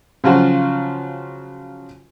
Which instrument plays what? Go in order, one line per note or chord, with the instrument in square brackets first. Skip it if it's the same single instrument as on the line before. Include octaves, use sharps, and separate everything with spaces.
[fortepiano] C#3 F3 F#3 F4 F#4